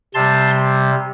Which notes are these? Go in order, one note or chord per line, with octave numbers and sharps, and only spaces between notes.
C3 G3 A5 C6